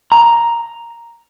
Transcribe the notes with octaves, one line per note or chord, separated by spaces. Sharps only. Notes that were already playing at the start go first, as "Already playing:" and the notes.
A#5